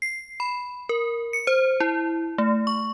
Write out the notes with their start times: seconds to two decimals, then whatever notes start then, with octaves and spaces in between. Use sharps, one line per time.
0.02 C7
0.40 B5
0.89 A#4
1.33 C#7
1.47 C5
1.80 E4
2.38 A3
2.67 C#6